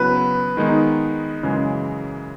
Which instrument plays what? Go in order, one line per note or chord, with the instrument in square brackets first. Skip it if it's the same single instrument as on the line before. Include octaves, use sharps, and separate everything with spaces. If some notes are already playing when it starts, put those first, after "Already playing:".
Already playing: [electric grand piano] C#3 F#3 B3 E4 [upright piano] B4
[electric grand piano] D#3 G#3 B3 D#4
F#2 C#3 E3 G#3